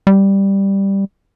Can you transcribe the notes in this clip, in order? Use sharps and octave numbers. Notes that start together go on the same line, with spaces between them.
G3